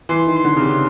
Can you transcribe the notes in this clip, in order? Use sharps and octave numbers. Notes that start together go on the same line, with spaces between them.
E3 C6
D#3
C6
D3
C#3
C3